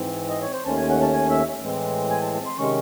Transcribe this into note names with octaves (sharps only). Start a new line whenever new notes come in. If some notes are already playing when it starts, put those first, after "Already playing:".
Already playing: G#2 E3 C4
D#5
C#5
C5
D#2 D#3 A3 C#4 A5
G#5
F#5
A5
G#5
E5
A2 E3 G#3 C4
G#5
A5
A5
C6
C3 D#3 G#3 C#4 C#6